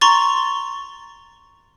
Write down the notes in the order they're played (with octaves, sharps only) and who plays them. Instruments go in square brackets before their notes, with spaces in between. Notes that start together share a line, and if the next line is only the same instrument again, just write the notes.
[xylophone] A#5 C6 C#6 A6